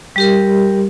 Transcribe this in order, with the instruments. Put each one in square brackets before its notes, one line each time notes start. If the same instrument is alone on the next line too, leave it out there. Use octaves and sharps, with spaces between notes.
[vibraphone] G3 G4 A#4